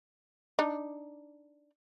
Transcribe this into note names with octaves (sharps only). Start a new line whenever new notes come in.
D4 D#4